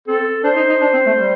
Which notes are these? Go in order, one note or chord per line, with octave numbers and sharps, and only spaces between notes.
C4 A4
D4 C5
D#4
D#4
D4
C4
A3
G3